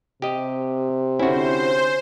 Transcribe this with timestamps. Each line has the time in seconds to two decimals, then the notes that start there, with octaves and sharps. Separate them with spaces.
0.22 C3 G4 D#5
1.19 D3 C#4 E4 F#4 C5